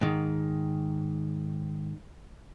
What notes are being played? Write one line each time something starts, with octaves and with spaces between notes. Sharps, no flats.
G#2 D#3